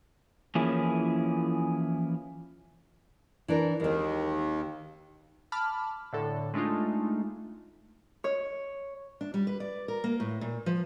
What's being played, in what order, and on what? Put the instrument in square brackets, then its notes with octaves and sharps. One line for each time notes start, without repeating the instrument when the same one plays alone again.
[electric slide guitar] E3 F3 A#3 C#4 E4 G#4
[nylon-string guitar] E3 D4 A#4
[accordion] D#2 D#3 [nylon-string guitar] G#3 C4
[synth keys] A5 B5 D6 F6
A2 D3 A4
G#3 A3 D4 D#4 F4
[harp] C#5
[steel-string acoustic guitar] D4
G3
B4
D5
A#4
A#3
A2
A#2
F3